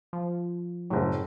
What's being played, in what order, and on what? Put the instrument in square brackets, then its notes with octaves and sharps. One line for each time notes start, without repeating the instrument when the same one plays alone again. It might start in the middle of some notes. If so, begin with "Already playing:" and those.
[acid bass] F3
[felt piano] F#1 A2 [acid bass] F#3